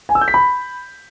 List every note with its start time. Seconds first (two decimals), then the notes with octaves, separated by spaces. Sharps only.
0.09 G#5
0.15 E6
0.21 G6
0.28 B6
0.34 B5